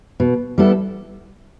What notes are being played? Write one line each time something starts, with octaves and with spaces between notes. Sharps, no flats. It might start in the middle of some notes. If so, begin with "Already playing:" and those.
B2
G3 B3 E4 A4